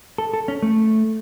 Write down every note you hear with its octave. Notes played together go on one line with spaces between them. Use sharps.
A4
A4
C#4
A3